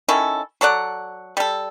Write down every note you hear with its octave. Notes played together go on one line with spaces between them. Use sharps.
D#3 C#4 E4 A4
F#3 A4 D5 F#5
G3 A4